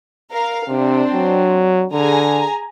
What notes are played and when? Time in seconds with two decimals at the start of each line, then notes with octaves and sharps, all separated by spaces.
0.31 A#4 F5
0.69 C3 C4 D4
1.14 F#3
1.93 D3 G#4 G#5 A#5